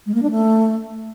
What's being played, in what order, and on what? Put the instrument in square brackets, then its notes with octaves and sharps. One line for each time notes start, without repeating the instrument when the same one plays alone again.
[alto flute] G#3
A#3
D4
A3